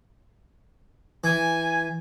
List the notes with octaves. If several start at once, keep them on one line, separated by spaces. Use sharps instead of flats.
E3 G#5